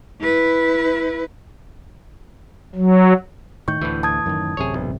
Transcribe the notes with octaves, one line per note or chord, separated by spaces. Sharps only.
E4 B4
F#3
A2 D#3 C#6 G6
D2 A2 E3
A5 D#6 G#6
F#2 D3 D#3
A1 F#2 C3 G#4 C#5
B1